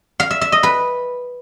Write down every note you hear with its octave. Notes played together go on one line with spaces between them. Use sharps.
F5
E5
E5
D#5
B4